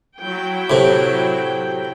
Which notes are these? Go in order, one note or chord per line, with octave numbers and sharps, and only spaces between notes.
F#3 E4 G5
A2 C3